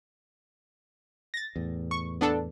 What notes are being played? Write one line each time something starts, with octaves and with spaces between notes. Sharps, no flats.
A6 A#6
E2 A2
C#6
B3 D4 A4